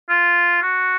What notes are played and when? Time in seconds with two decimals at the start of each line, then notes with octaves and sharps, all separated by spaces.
0.10 F4
0.62 F#4